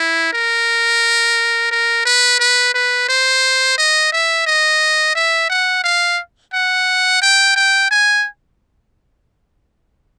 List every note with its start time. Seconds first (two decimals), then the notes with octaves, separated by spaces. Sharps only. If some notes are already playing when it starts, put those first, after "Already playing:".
Already playing: E4
0.33 A#4
1.71 A#4
2.05 B4
2.39 B4
2.74 B4
3.09 C5
3.78 D#5
4.12 E5
4.46 D#5
5.15 E5
5.49 F#5
5.84 F5
6.53 F#5
7.21 G5
7.56 G5
7.91 G#5